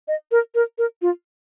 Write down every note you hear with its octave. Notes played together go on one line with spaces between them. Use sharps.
D#5
A#4
A#4
A#4
F4